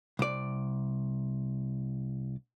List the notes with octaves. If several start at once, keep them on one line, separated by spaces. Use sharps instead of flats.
C2 D5